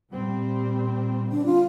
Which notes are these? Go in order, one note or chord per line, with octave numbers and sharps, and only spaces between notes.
A#2 G3 C4
D3 G3 C4 D4
F4